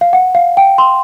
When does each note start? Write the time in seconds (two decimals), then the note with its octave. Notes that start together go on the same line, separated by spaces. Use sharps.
0.01 F5
0.13 F#5
0.35 F5
0.57 G5
0.78 C6